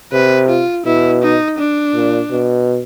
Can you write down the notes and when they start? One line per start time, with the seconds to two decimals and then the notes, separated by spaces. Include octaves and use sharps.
0.13 C3 B4
0.49 F4
0.86 B2 E4
1.23 D#4
1.59 D4
1.95 A#2
2.31 B2